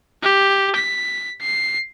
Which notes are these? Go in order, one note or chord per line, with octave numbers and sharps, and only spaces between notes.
G4
B6
C7